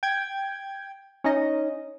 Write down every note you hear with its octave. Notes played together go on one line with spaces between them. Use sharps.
G5 G#6
C#4 D#4 D#5